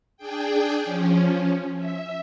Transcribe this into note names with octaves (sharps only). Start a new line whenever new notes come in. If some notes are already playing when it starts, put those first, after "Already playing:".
D4 G#4 G5
F3 C#4
E5